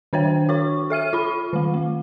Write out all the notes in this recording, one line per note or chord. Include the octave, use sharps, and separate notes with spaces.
D#3 D4 C5 C#5 G5
F#4 C#5 C#6
A4 E5 F6 D#7
F4 B5
D#3 A3
A3